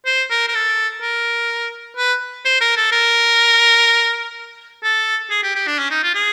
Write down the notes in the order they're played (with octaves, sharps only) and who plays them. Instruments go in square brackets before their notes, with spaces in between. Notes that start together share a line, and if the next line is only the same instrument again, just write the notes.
[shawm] C5
A#4
A#4
A4
A#4
B4
C5
A#4
A4
A#4
A4
G#4
G4
G4
D4
C#4
D#4
F4
G#4